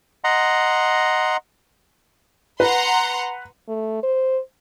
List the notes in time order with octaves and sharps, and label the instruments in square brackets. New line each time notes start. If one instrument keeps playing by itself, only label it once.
[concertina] D#5 F#5 A#5 C6
[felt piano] B4 [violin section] F#5 A#5 C6
[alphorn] A3
C5